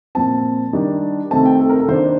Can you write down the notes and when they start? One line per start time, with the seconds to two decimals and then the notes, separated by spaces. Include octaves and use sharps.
0.15 A#2 F3 C4 A5
0.73 D#3 G3 D4
1.31 C3 D#3 A3 C4 A5
1.46 G5
1.60 A4
1.69 A#4
1.79 A4
1.88 D#3 A#3 D4 C5